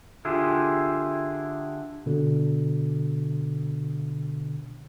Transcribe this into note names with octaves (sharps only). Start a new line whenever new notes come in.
D3 E4 F4 G4 G#4
B2 D3